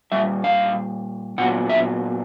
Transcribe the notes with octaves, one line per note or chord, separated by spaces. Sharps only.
A#2 G3 E5
F5
A#2 F#3 B3 F#5
E5